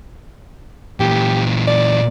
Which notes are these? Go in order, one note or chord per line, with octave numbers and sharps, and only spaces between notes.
A#2 E3 G4
D5